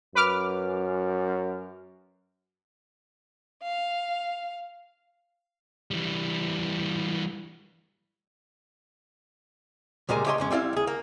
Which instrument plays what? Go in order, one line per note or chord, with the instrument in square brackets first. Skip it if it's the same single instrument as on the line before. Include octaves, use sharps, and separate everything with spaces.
[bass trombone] F#2 [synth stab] B4 D6 F6
[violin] F5
[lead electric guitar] E3 G3
[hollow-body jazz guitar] C#2 A#2 G3 G#3 A#4 G#5
A3 G4 C#5 D#5 A5 C6
F2 G#3 C#4
G3 C4 E4 D5 F5
D#2 G#4
A#3